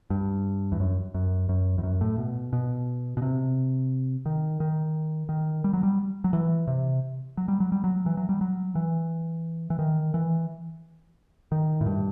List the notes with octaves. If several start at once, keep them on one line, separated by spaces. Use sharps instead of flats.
G2
E2
F#2
F#2
F#2
E2
F#2
A2
B2
B2
B2
C3
D#3
D#3
D#3
G3
F#3
G3
F#3
E3
C3
F#3
G3
F#3
G3
F#3
E3
F#3
G3
F#3
E3
E3
D#3
E3
D#3
A2
G2